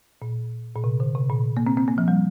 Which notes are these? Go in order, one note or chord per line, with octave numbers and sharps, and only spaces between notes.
A#2
A#2
C3
D3
C3
A#2
A#3
C4
C4
A#3
F3
G3